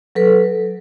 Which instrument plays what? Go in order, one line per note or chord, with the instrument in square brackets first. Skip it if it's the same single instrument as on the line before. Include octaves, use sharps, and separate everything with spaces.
[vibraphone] F#3 A4 B4